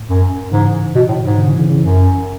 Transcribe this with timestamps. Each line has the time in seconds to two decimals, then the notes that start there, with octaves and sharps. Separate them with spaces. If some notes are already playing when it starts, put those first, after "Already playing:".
Already playing: A2
0.09 F#2
0.52 G#2 C#3 E3
0.95 B2
1.09 A2
1.23 G#2
1.38 B2 D3
1.48 C#3 E3
1.59 C#3 E3
1.70 C#3 E3
1.81 F#2